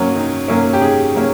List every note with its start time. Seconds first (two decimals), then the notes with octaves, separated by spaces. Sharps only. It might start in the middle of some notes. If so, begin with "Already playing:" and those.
Already playing: D#3 F#3 A#3 C#4
0.16 D#3
0.48 F#3 A#3 C#4
0.73 G4
0.81 D#3 G#4
1.15 F#3 A#3 C#4